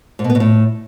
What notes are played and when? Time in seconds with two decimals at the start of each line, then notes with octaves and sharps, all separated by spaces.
0.19 G#2
0.24 B2
0.30 B3
0.35 B2
0.40 A2